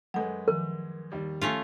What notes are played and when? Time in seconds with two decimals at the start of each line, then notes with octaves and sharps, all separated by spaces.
0.14 F#2 G#3 A4 B4 F#5
0.48 D#3 F3 A#4
1.12 D#2 G3
1.42 A3 C#4 F4